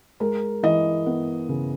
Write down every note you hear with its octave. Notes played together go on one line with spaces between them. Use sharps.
G#3 A#4
E3 D#5
B3
C#3